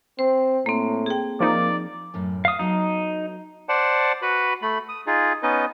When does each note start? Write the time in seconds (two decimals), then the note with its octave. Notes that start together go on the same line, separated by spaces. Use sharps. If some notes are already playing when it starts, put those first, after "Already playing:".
0.19 C4 C5
0.66 A2 A#3 C4
1.06 G#4 G5
1.40 F3 A#3 D#4 D5
2.14 F#2 A2 C#4
2.45 F5 D#6
2.59 F#3 B3 D#4 A4
3.69 C5 D5 F#5 A5
4.22 F#4 B4 B5
4.62 A3 B5
4.89 D#6
5.07 D#4 F4 G#4
5.43 B3 C#4 D#4 B4 D#5